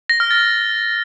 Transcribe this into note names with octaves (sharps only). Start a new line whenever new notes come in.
A#6
F6
A6